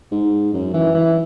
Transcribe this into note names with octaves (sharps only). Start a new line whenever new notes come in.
G#2
F#2
E3
E3